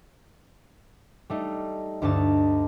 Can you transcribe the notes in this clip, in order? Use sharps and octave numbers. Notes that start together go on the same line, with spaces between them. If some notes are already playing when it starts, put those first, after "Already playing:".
G3 A3 D#4
D2 G2 A3 D4 D#4 A5